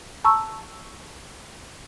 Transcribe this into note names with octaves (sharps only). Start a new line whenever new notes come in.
A5 A#5 C#6 E6